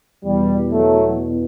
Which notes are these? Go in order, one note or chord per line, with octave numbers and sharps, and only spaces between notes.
E2 B2 G3
F#3 A3